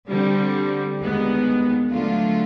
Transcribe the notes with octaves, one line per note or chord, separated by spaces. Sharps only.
D3 G3 C4
D#2 D#3 G#3 B3
D3 F#3 A3 D4 F4